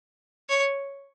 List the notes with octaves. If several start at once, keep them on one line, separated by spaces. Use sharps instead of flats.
C#5